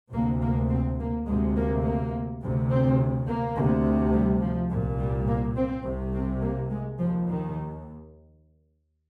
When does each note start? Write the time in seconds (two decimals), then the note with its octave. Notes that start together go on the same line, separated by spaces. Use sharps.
0.12 D2 C3 A#3
0.41 A#3
0.70 C4
0.99 A#3
1.27 D2 C3 G#3
1.56 A#3
1.84 A#3
2.41 D2 C3
2.71 C4
3.28 A#3
3.56 D2 C3
4.13 G3
4.41 F3
4.71 C2 A#2
4.99 G3
5.27 A#3
5.56 C4
5.85 C2 C3
6.14 C4
6.43 A#3
6.71 G#3
6.99 D#2 F3
7.28 D#3